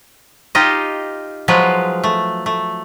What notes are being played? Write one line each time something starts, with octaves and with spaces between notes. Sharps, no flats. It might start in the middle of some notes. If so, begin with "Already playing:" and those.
D#4 F4 G4 D#5
F3 F#3 G#3 F4 B4
A3
A3